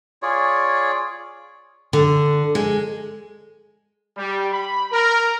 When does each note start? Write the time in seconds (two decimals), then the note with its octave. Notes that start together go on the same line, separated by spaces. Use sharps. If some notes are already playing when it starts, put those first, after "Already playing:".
0.23 F4 G#4 C#5 D5
1.93 D3
2.55 G#3
4.18 G3
4.53 B5
4.91 A#4